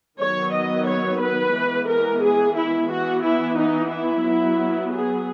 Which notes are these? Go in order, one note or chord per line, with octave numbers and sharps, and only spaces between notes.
D#3 F#3 B3 C#5
D#5
C#5
B4
E3 G#3 B3
A#4
G#4
E4
E3 B3 F#4
E4
D#4
E4
F#3 B3
G#4